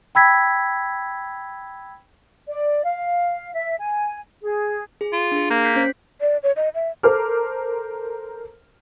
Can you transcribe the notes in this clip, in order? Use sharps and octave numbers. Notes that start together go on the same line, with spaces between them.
G5 B5 E6 G#6 B6
D5
F5
E5
G#5
G#4
G#4
F4
D4 G#4
A#3 G6
G6 B6 C7
C#4 C5 B6
D5
C#5
D#5
E5
A4 A#4 C5 D6 F6